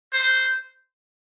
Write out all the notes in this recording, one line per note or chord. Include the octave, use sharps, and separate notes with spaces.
C5